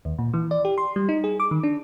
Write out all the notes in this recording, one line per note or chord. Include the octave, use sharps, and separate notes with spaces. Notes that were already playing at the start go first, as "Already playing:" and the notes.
D#2
A#2
E3
D5
G4
C6
G3
D#4
G#4
D6
D#3
D4